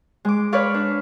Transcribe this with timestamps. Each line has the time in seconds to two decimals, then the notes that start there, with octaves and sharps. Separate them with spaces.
0.25 G#3 D6
0.52 B4 C#5 D5 F5
0.74 D4